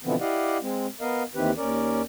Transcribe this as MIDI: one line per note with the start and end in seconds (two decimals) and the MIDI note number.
0.04 0.15 47
0.04 0.15 50
0.04 0.15 52
0.04 0.15 53
0.04 0.15 59
0.04 0.15 60
0.20 0.58 64
0.20 0.58 67
0.20 0.58 74
0.20 0.58 75
0.20 0.58 77
0.20 0.58 78
0.62 0.87 56
0.62 0.87 60
1.01 1.23 59
1.01 1.23 70
1.01 1.23 75
1.01 1.23 77
1.35 1.51 39
1.35 1.51 51
1.35 1.51 52
1.35 1.51 60
1.35 1.51 67
1.35 1.51 71
1.58 2.02 39
1.58 2.02 61
1.58 2.02 70
1.58 2.02 74